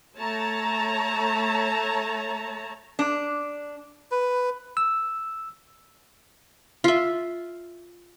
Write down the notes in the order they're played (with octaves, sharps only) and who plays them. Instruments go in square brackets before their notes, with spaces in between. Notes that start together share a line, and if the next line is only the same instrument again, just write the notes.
[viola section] A3 C#5 A5 A#5
[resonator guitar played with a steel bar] D4
[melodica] B4
[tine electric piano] E6
[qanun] F4 E5